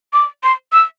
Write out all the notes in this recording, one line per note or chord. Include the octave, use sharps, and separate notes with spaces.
D6
C6
E6